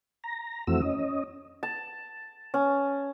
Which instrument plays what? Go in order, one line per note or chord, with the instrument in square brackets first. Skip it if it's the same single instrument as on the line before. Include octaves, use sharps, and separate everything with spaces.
[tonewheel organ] A#5
F2 E3 A3 C4 F#4 E6
C#4 D#5
[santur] A5
C#4